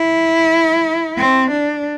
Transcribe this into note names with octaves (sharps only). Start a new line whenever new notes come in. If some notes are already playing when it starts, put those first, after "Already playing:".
Already playing: E4
C4
D4